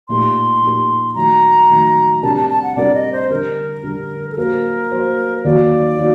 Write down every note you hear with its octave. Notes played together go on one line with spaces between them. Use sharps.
A#2 A3 D#4 G4 A#4 C6
A#2 A3 D#4 G4 A#4
D#3 F#3 A3 A#5
D#3 F#3 A3
C3 G3 D4 G4 A#4 A5
A5
A5
F#5
C3 G3 D4 G4 A#4 D5
D#5
C5
D3 G3 D4 A#4
D3 G3 D4
A4
F#3 A#3 F#4 A#4 C5
F#3 A#3 F#4 C5
D#2 D#3 F#3 A#3 F#4 D5
D#3 F#3 A#3 F#4